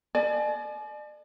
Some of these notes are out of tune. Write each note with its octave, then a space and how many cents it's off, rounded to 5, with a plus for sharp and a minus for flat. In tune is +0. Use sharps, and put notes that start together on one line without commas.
D5 +40 G#5 +45